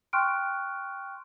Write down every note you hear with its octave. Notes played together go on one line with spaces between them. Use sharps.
G5 C6 C#6 F6 F#6 D7